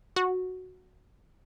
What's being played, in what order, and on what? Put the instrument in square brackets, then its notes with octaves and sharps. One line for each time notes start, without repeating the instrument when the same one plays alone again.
[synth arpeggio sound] F#4